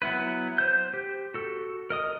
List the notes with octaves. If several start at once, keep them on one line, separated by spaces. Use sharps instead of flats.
F#3 B3 E4 B4
C5 G6
G4
F#4 A4
A#4 D#5 D#6